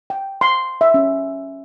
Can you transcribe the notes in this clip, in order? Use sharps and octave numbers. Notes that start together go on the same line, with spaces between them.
G5
C6
E5
C#4